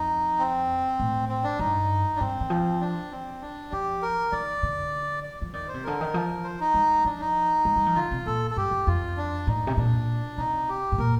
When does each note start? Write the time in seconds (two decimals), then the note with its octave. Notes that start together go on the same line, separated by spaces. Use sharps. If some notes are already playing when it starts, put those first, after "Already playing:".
Already playing: F2 D#4
0.39 C4
1.00 A2
1.29 C4
1.44 D4
1.59 G2 D#4
2.16 D4
2.20 G2 C4
2.41 D#3
2.50 F3
2.81 D4
3.11 C4
3.41 D4
3.72 F3 G4
4.02 A#4
4.32 D#3 D5
4.63 D3
5.24 D5
5.42 F3
5.53 D#3 D5
5.68 C5
5.74 C3
5.84 D3 A#4
6.01 D#3
6.14 F3
6.44 C5
6.60 D#4
6.74 G3
7.05 F3 D4
7.20 D#4
7.65 G3
7.76 G3
7.86 F3
7.96 D3 F4
8.11 C3
8.26 A#2 A4
8.51 A4
8.57 G2 G4
8.71 F2
8.87 F2 F4
9.17 D4
9.47 A2 D#4
9.67 C3
9.77 A#2 D4
10.38 C3 D#4
10.69 G4
10.92 A2
10.98 A#2 A#4